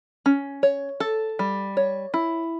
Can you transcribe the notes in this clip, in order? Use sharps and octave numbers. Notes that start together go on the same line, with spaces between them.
C#4
C#5
A4
G3
C#5
E4